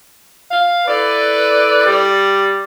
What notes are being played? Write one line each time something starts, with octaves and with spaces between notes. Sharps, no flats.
F5
E4 A4 B4 D5
G3